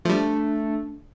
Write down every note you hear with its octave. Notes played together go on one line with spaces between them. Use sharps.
F3 G3 A3 D4